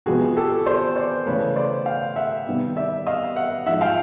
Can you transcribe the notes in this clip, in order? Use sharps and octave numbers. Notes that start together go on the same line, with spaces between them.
C3 F3 G#3 B3 F#4 G#4
G4 A4
C5 D5
C5 D5
C#3 E3 A3 B4 C#5
C5 D5
F5 G5
E5 F#5
C3 D#3 G3 B3
D5 E5
D#5 F5
E5 F#5
G#2 F3 G#3 E5 F#5
F5 G5